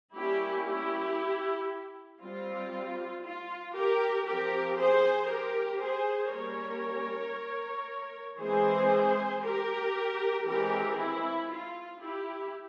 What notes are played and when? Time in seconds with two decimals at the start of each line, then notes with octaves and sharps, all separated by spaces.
0.15 G3 A#3 C#4 E4 G4
0.67 E4 G4
2.21 G3 C4 F4
3.25 F4
3.76 G4 A#4
4.27 F3 C4 G4 A#4
4.79 G#4 C5
5.30 G4 A#4
5.82 G#4 C5
6.34 G3 A#3 C#4 A#4 C#5
8.40 E3 G#3 C4 G#4 C5
9.44 G4 A#4
10.46 E3 G#3 C4 G4 A#4
10.98 E4
11.50 F4
12.01 E4 G4